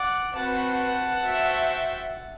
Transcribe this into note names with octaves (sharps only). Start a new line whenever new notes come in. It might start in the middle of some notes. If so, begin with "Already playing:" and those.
Already playing: D5 F#5
C4 F#4 B4 F#5 A5
F#4 C5 E5 G5